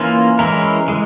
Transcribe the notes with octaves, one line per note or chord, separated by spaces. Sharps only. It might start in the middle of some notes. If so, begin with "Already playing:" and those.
Already playing: E3 A#3 C#4 F4
E3 G#3 C#4 E4 A#4
E3 G#3